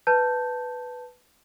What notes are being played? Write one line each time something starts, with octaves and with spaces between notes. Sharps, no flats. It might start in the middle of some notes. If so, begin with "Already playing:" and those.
B4 A5 G6